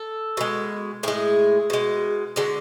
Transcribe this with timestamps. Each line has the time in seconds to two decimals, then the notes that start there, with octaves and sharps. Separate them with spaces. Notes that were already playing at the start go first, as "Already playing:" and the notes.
Already playing: A4
0.37 B2 G#3
1.03 A2 G#3 G#4
1.70 B2 G#3
2.36 D3 G#3 F#4